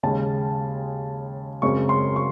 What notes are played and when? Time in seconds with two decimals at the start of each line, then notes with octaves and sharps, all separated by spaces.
0.03 D#2 C#3 G#3 A5
1.62 F#2 C#3 G#3 C4 C#6
1.89 C6
2.16 C#6